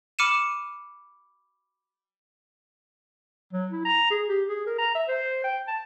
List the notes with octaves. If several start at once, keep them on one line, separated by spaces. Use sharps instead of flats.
B5 D6 F6 C#7 D#7 E7
F#3
E4
A#5
G#4
G4
G#4
A#4
A#5
E5
C5
G5
A5